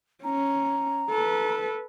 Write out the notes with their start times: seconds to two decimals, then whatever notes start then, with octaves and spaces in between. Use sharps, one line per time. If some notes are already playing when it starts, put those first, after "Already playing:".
0.24 C#4 A#5
1.10 A4 B4